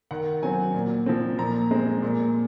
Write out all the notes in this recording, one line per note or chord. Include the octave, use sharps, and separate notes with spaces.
D#3 F#5
F#3 C4 G#5
A#2
F3 C4
A#2 A#5
G#3 C4
A#2